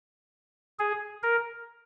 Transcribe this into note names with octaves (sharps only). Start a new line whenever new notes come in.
G#4
A#4